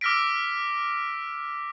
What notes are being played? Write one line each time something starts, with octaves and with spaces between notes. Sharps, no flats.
D6 E6 F6 A#6 B6 D7